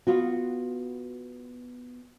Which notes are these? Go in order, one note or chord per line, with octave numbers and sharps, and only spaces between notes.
B3 F4 F#4